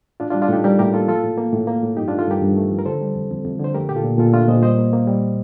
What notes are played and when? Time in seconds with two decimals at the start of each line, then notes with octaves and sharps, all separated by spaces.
0.20 A2 D4 F4
0.31 G3 D4 F4
0.42 D4 F4
0.48 A2 D#4 G4 A4
0.64 G3 G4 A#4
0.79 A2 G4 A#4
0.94 A#3 F4 A4
1.08 F3 F4 A4
1.24 A2
1.37 A#3
1.53 A2
1.67 A#3
1.83 A2
1.97 G2 D#4 G4
2.08 A3 D4 F4
2.19 F4 A4
2.27 G2 G4 A#4
2.42 G2
2.57 A3
2.71 F3
2.79 A#4
2.86 D3 A4 C5
3.01 G3
3.15 F2
3.31 F2
3.45 F2
3.59 D3
3.64 C5
3.74 A3 G4 A#4
3.89 A#2 G4
3.96 F4 A4
4.05 A#2
4.18 A#2 F4 A4
4.33 A3 D4 F4
4.48 A#2 C5 D#5
4.63 G3 C5 D#5
4.78 A#3
4.93 A#3
5.07 G3